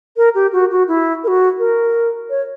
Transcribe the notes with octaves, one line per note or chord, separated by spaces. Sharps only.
A#4
G4
F#4
F#4
E4
A#4
F#4
A#4
C#5